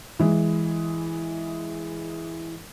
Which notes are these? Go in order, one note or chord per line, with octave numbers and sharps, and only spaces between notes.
E3 G#3